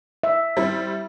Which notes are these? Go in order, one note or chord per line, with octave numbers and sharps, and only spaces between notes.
E5
G3 C4 E4